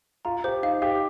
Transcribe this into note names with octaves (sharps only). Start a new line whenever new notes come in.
F4 A#5
G4 C5
D#4 F5
G4 F5